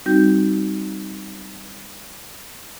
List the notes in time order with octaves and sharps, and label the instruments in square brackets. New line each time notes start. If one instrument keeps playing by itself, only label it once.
[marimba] G3 C4 D#4 F#4 G6